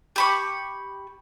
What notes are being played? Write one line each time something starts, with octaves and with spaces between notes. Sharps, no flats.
G4 B5 C#6